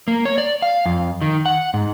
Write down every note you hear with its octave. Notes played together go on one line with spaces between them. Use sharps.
A#3
C#5
D5
F5
F2
D#3
F#5
G#2